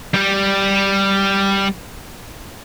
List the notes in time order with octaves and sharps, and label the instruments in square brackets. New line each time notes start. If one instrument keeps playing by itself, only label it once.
[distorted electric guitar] G3 G4